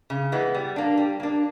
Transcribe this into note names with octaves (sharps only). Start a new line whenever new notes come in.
C#3
E3 G#3 B3
G3
A#3 D4
G3
A#3 D4